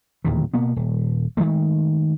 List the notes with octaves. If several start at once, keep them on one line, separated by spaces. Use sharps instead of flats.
D1 D#2 A#2 E3
B2 A#3 B3
D#1
D#3 E3 G#3 A3